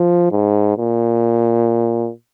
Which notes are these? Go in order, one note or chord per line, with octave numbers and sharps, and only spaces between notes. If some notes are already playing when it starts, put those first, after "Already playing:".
Already playing: F3
G#2
A#2